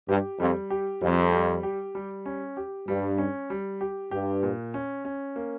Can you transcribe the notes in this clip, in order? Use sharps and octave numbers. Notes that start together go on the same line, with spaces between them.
G2 G4
F2 G3
G4
F2 G3
G3
G4
G3
C#4
G4
G2 G3
C#4
G3
G4
G2 G4
A#2
C#4
C#4
A#3